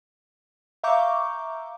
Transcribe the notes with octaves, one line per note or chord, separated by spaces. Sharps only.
E5 F5 A#5 C#6 D6 G6